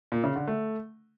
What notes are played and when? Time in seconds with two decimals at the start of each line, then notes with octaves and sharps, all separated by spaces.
0.12 A#2
0.24 C#3
0.36 D3
0.48 A3